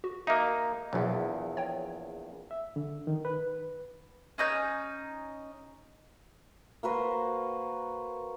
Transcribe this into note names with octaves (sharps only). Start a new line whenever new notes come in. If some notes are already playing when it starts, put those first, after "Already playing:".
F#4
A#3 D#4 E5
A#1 E2 B2 F#3
C#5 G5
E5
D3
D#3
B4
C#4 D#4 G6
A#3 F#4 B4 C5